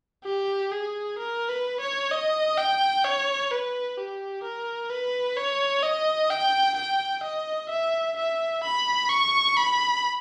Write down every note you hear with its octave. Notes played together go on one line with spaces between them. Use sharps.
G4
G#4
A#4
B4
C#5
D#5
G5
C#5
B4
G4
A#4
B4
C#5
D#5
G5
G5
D#5
E5
E5
B5
C#6
B5